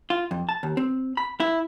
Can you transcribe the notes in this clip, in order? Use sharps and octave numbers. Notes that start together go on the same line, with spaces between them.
F4
F2
A5
D#2
C4
B5
E4